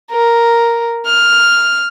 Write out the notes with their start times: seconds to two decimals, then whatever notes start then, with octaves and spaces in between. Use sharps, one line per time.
0.11 A#4
1.06 F6